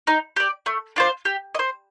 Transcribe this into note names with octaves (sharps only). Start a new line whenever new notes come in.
D#4
G4 D5
A3
D4 F4 C5
G4
D#5
C5